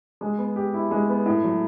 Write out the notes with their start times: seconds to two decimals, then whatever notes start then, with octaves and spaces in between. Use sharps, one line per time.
0.21 G#3
0.38 B3
0.56 G4
0.74 E4
0.91 G#3
1.09 B3
1.26 A2
1.43 F#3